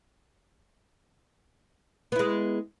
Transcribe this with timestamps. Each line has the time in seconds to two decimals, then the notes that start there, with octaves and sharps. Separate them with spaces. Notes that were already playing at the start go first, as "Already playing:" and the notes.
2.12 B3
2.16 E4
2.19 G#3